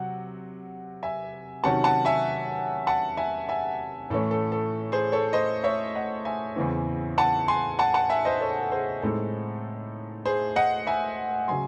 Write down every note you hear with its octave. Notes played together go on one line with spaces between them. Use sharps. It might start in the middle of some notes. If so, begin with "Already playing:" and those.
Already playing: C3 F#3 F#5
E5 G#5
C3 D#3 F#3 C#4 F#5 A5
F#5 A5
E5 G#5
F#5 A5
E5 G#5
E5 G#5
A2 E3 A3 C#4 A4
A4
A4
G#4 C5
A4 C#5
C5 D#5
C#5 E5
D#5 F#5
E5 G#5
E2 C#3 E3 C4
F#5 A5
G#5 C6
F#5 A5
F#5 A5
E5 G#5
C5 D#5
A4 C#5
A4
G#4 C5
A2 G#3 C4 D#4 A4
G#4 C5
D#5 F#5
E5 G#5
C#3 F#3 G#5 C6